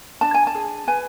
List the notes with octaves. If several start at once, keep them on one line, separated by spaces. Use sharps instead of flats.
D4 A5
G#5
A5
G#4
B4 G#5